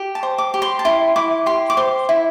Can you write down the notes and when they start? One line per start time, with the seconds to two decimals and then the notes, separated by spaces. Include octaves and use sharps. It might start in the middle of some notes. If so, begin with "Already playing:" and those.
Already playing: G4
0.15 A5
0.23 C5
0.38 D6
0.54 G4
0.62 C6
0.79 A5
0.85 E4 C6
1.16 E4 D6
1.46 G4 C6
1.70 D6
1.77 C5 C6
2.09 E4